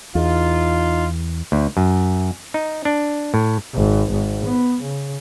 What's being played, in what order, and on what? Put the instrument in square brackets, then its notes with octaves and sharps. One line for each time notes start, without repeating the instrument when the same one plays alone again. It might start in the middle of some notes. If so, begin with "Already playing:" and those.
[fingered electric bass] E2 [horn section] D#4 F4
[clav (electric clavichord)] D2
F#2
D#4
D4
A2
[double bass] G#1
G#1
B3
C#3